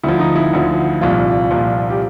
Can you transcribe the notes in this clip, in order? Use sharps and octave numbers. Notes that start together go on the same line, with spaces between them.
D2 D3 F3 E4
D#4
E4
D2 D3 F3
C2 A#2 F3 F4
C2 A#2 F3
G4